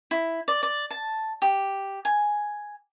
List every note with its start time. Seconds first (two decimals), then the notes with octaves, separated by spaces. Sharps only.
0.11 E4
0.48 D5
0.63 D5
0.91 A5
1.42 G4
2.05 G#5